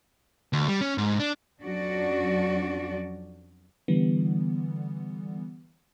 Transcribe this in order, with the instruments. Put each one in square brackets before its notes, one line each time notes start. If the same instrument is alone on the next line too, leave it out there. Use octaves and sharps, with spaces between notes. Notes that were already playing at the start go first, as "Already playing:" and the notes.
[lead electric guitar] D2
G3
C#4
G#2
D4
[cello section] F2 F#3 C#4 D4 F#4 D5
[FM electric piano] D3 E3 G3 B3